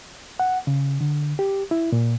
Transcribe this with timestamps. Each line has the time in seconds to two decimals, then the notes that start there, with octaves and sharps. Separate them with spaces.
0.40 F#5
0.67 C#3
1.01 D3
1.39 G4
1.71 E4
1.92 A#2